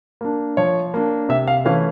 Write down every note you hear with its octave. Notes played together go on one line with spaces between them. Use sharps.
A#3 D4
F3 C#5
A#3 D4
C3 E5
F5
E3 A3 C#4 F5